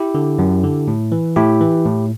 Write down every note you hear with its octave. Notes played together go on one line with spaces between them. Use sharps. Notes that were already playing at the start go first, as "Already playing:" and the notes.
Already playing: E4 G4
D3
F#2
D3
A2
E3
A2 E4 G4
E3
A2